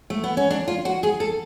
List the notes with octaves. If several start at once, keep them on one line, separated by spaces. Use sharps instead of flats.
A3
B3
C#4
D4
F4
F#4
G#4
A4